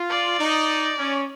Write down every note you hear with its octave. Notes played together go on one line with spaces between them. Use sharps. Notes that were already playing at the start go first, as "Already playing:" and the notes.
Already playing: F4
D5
D#4
C#4